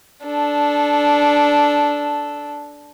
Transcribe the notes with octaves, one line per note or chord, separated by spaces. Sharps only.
D4 A4